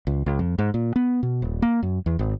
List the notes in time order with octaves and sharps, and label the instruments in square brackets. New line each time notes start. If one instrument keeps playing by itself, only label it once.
[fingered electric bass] C#2
C#2
F2
G#2
A#2
B3
B2
D#1
A#3
F#2
E2
G#1